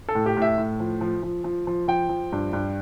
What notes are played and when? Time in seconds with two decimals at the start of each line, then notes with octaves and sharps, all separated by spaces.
0.09 A4
0.15 A2
0.26 G4
0.37 A2
0.42 E5
0.58 A2
0.80 F3
1.01 F3
1.23 F3
1.44 F3
1.67 F3
1.88 F3 G5
2.09 F3
2.32 G2
2.53 G2